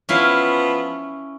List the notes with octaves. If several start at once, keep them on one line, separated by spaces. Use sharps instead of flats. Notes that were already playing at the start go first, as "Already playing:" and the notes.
F3 B3 C#4 E4 F5